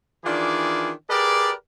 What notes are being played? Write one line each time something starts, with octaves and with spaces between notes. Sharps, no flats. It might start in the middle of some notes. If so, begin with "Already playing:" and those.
D#3 E3 D4 F4 G#4 D5
G4 G#4 A#4 B4 D5